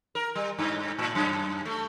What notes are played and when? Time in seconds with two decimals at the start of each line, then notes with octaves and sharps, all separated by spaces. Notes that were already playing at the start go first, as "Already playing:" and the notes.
0.15 A#4
0.35 G3
0.59 G2
0.99 A2
1.15 F#2
1.65 A3